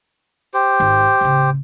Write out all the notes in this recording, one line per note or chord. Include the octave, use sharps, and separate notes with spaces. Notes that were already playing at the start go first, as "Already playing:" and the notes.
G4 C5
G#1
A1 C#3